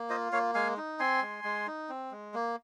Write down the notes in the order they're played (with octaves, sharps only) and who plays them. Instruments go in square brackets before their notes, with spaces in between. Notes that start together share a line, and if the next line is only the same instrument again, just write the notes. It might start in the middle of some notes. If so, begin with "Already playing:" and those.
Already playing: [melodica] A#3
F4 C5 D#5
A#3 C#5 F5
G#3 F5 G#5
D#4
C4 G#5 C6
G#3
G#3
D#4
C4
G#3
A#3